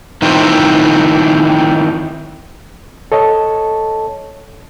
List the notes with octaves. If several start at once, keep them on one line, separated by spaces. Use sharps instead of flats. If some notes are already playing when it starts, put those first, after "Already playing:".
D#3 E3 A3 C4 F4
A4 C#5 D#5 A5